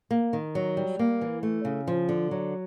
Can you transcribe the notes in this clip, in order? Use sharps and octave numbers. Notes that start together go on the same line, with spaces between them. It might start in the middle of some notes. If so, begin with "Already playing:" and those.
A#3
D#3
F#3
G3
A#3
E3
A3
C#3
F3
D3
F#3